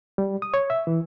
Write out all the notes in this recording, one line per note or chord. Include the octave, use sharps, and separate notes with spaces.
G3
D#6
C#5
E5
E3